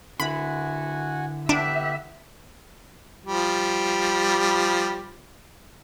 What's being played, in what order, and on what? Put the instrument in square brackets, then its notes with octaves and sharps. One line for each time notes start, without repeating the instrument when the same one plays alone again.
[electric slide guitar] D3 E4 [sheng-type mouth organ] F#4 F#5 G#5 [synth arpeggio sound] B5
[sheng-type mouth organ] B3 G4 F#6 [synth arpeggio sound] D4 [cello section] E5
[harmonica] F3 G3